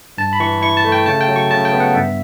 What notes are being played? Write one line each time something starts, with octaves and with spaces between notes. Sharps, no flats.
G2 A5
B5
E3 C#6
E4 C#6
A5
A3
G5
C#3 A5
G5
F#3
C#6
C#3 A5
G5
B3
F#5
G2 E5